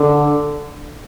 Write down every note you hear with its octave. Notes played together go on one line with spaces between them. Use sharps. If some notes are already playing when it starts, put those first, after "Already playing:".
Already playing: D3